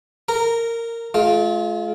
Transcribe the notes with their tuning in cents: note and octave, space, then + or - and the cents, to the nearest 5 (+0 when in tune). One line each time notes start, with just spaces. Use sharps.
A#4 -15 A#5 +0
G#3 +45 F4 +0